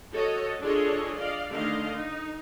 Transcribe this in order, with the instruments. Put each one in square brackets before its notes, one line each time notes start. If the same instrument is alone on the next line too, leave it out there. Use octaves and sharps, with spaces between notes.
[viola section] F#4 A4 C#5 D#5
D4 F4 G#4 A4 C#5 D#5
D5 D#5 F5
D3 D#3 A3 D#5 F5
D#4